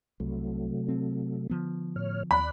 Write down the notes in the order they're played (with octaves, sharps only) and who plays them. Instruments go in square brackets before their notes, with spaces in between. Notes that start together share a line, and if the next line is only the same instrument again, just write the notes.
[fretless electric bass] C2 [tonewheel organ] C3 F#3 A3
[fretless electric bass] C4
D3 F3 B3
[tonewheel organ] A2 C#5 F6
[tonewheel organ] D#2 D5 F#6 [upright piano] B5